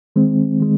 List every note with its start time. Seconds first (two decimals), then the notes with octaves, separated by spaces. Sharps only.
0.16 D#3 G#3 C4
0.60 D#3 G#3